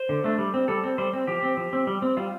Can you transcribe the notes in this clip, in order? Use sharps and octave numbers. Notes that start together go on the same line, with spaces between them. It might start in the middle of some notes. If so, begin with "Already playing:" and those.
Already playing: C5
D3
A3 D4
G3
C4
G3 A4
C4
G3 C5
C4
F3 G4
C4
F3
C4
G3
C4
G3 F4